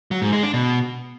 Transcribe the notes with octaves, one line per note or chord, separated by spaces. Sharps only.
F#3
G#2
G#3
D4
B2